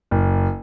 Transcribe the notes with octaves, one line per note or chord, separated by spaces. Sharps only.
F#1